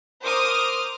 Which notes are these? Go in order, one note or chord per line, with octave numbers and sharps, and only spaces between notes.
A#4 C5 D6 D#6 F6